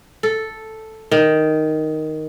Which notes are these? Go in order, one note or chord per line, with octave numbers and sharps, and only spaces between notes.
A4
D#3